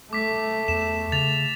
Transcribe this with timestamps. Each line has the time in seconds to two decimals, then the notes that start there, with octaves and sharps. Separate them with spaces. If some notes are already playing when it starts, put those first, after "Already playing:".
0.13 A3 D6 B6
0.68 E2 E7
1.12 C#3 A6 F7